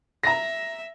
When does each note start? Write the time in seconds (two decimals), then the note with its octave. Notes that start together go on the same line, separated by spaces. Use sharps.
0.23 E5 A#5 A#6